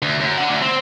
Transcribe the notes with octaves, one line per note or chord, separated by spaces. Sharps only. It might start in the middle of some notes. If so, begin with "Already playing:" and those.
D2
F#2
D4 F#5
D2
C4